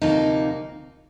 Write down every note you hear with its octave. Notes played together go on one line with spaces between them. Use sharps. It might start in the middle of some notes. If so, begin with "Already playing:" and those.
D2 C3 F3 A#3 D#4